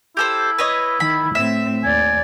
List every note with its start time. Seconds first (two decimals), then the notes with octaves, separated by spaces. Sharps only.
0.17 E4 G4 A4 C5
0.58 B4 C#5 D#5
1.00 D#3 B5
1.35 A2 C4 E5
1.84 D#2 D5 G#5